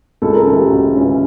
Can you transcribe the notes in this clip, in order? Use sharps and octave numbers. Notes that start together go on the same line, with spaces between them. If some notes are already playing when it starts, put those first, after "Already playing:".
C#2 A4
A#4
C#3 E3 A4
G4
C#2 F#4
C#3 E3